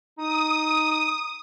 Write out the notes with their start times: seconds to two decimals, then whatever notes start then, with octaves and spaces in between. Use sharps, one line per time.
0.18 D#4 D#6